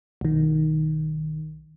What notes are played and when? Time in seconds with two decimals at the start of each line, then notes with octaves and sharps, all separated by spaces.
0.21 B1 D#3